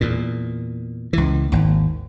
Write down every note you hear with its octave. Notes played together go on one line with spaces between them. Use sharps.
E2 A#2
C#2 E3
G#1 D#2